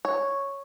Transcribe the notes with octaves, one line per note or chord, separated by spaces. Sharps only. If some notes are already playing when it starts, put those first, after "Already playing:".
C#5